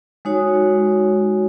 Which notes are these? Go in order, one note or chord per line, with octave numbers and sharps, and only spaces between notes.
G#3 D#4 F#4 C#5